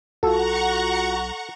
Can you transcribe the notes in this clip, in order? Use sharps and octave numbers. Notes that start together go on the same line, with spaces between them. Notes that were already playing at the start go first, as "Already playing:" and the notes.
B1 F4 F#4 A4 F#5 A#5 C#6